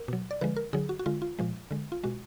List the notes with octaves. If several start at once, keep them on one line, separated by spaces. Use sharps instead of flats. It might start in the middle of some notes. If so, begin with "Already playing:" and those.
Already playing: A#4
B2 F#3
D5
D3 F3 G#3 B4
A#4
D3 F#3 G#4
F#4
F#4
D3 G#3 F4
F4
A#2 F3 G#3
D3 G#3
F4
B2 G#3 F#4